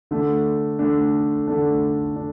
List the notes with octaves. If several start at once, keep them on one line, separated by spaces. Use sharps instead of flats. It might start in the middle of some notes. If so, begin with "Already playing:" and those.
D3 A3 D4
D3 A3 D4
D3 A3 D4
D4